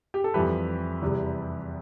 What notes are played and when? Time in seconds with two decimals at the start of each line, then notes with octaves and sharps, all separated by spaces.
0.14 G4
0.24 A4
0.34 F2 E3 G3 G4 B4
1.02 E2 C3 G3